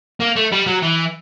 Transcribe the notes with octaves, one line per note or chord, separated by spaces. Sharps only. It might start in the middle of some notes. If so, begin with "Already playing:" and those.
A#3
A3
G3
F#3
E3